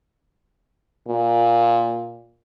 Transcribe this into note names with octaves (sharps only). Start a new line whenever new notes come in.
A#2